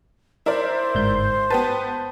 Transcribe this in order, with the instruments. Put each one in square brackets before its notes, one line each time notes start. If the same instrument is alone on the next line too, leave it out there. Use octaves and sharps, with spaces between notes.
[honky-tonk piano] E4 A#4 D5 [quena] C5
[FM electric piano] G1 G#2 G6
[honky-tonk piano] B3 G4 B4 [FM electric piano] A5